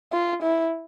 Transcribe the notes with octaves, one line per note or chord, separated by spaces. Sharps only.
F4
E4